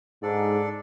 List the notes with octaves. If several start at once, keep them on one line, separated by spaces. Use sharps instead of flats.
G#2 D4 A4 D5